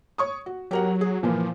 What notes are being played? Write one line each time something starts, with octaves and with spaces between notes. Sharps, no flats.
C#5 C#6 D#6
F#4
F#3 G4 A#4 F#5
G#4
A#2 E3 F3 A#3